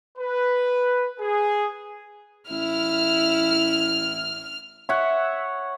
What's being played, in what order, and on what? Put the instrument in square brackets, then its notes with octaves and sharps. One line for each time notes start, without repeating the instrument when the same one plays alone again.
[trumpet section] B4
G#4
[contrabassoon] A1 [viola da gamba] E4 [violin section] F6
[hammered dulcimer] C#5 F#5 [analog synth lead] E5